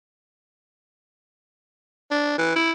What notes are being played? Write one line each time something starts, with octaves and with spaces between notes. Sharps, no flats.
D4
E3
E4